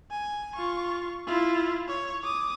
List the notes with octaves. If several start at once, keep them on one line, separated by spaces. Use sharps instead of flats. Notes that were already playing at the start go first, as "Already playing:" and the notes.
G#5
F4 C#6
E4 F4
C#5
D6 D#6